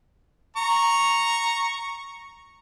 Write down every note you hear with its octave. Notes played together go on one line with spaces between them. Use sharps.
A#5 C#6